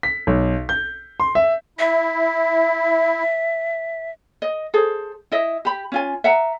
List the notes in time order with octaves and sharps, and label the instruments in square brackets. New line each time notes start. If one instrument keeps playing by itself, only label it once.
[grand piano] B6
B1
G6
C6
E5
[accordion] E4 [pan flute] E5
[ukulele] D#5
G#4 A4 C5
E4 D#5 E5
G4 B5
C#4 F4 G#5
E5 F#5 A#5